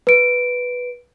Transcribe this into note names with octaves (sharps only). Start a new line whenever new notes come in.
B4 D7